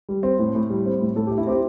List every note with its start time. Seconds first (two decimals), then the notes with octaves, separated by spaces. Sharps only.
0.09 G3
0.23 C4
0.39 A2
0.55 A2
0.70 G3
0.86 C4
1.01 A2
1.16 A2 A4
1.27 A3 G4
1.38 E4
1.47 C4 G4